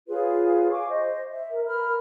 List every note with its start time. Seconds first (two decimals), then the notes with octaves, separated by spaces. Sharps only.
0.08 F4 G#4 B4 C#5
0.71 F5 G#5 C#6 D6
0.89 C5 D#5
1.31 E5
1.50 A#4
1.67 A#4 B4 B5 F6